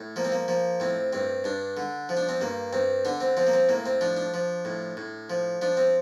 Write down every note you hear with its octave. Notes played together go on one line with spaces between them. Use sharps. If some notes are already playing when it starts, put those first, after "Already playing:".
Already playing: A2
F3 A#3
C4
A#3
F3 A#3
A2 C4
G2 C4
G2 D4
D3
F3
D4
C4
G2 A#3
G2 C4
D3 D4
C4
F3 C4
A#3
C4
A2 A#3
C4
F3 D4
D4
F3
A2
A2
F3
F3 D4
C4